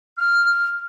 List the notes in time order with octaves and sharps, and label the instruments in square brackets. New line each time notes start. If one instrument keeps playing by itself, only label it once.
[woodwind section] F6